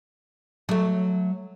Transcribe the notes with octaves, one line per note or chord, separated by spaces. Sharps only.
F#3 A3